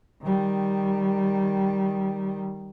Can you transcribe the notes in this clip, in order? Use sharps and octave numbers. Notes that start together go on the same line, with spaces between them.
D#3 G3